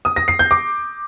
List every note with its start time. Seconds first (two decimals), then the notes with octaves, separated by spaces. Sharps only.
0.05 D#6
0.16 A#6
0.28 C7
0.39 G6
0.51 D6